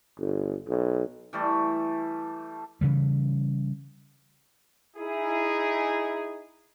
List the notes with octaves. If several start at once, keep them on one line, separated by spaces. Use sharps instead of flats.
G1
B1
E3 G3 A3 A4
C#3 E3 G3
D#4 E4 G#4